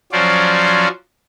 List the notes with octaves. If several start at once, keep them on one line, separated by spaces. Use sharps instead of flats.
F3 F#3 C#4 C5 D5